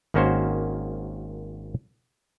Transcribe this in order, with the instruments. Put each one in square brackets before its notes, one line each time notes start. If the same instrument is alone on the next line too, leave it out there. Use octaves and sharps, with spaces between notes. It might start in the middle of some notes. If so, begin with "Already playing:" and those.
[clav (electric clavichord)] G#1 D#3 A#3 C#4 F#4 C5